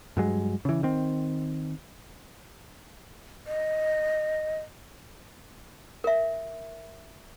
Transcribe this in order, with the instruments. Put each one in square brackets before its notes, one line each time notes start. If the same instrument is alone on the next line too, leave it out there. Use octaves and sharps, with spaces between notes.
[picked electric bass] G2 F#3 G#3
C#3 E3
D#3 C4
[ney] D#5
[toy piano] A#4 E5